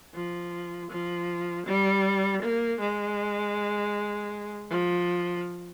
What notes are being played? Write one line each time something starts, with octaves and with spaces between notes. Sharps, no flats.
F3
F3
G3
A#3
G#3
F3